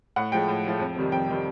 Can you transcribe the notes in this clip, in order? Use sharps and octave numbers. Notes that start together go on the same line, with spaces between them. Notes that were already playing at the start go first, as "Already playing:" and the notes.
A2 F#5
F3 G#3 G5
A2
F3 G#3
F2
C3 D#3 G3
F2 G5
C3 D#3 G3